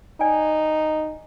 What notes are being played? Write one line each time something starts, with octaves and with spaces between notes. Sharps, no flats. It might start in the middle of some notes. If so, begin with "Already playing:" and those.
D#4 D5 G5 G#5